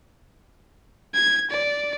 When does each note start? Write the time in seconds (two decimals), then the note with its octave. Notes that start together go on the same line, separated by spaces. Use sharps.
1.15 G#6
1.51 D5